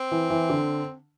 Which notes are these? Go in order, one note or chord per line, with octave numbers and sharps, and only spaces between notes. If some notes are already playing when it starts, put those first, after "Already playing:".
Already playing: C4
E3
E3
D3